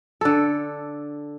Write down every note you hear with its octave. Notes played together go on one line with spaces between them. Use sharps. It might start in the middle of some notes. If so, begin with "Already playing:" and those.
D3 A4